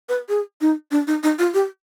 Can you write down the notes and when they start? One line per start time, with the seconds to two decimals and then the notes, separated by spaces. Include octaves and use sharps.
0.09 B4
0.29 G#4
0.61 D#4
0.91 D4
1.07 D#4
1.23 D#4
1.39 F4
1.54 G4